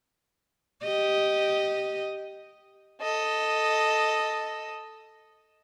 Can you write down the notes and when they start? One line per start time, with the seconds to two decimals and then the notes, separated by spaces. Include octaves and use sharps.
0.84 G4 D#5
3.01 A4 D#5